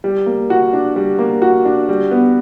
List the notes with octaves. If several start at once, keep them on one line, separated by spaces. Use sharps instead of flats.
G3
A#3
F#4
D4
G3
A#3
F#4
D4
G3
B3